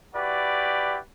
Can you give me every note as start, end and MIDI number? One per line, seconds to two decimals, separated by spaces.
0.15 0.98 64
0.15 0.98 66
0.15 0.98 67
0.15 0.98 71
0.15 0.98 74